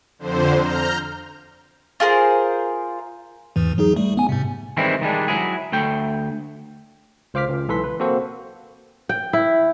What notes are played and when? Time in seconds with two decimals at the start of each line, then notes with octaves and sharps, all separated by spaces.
0.19 F2 D3 C5
0.60 A#5 F6 G6
2.00 F4 G#4 A#4 C5
3.56 E2 G#2 E3
3.78 F#3 D#4 G#4
3.96 G3 A3
4.17 B3 G#5
4.29 G#2 C3
4.77 D#3 E3 G3 G#3 C4 E4
5.01 D#3 G3 G#3 D4
5.28 F#3 E4 G#4
5.73 D2 A3 G5
7.34 C#2 C5 F5 D6 F6 B6
7.48 C#2
7.68 B1 E3 A4 B4 C6 B6
7.84 B4
8.00 A#3 C4 F#4 A4 C5
9.09 G5
9.33 E4